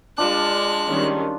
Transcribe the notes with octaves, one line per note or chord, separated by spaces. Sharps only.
G#3 D4 F4 F#6
D#3 G3 C#4